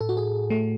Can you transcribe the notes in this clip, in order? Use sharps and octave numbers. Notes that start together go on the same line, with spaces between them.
A2 A4
F#4
G#4
A3